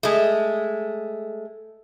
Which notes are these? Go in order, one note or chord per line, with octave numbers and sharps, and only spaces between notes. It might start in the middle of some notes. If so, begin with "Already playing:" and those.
G#3 A3